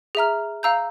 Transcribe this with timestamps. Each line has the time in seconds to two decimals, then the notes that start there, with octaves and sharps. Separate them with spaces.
0.15 G#4 E5 A#5 F6
0.63 F5 A#5 E6 G6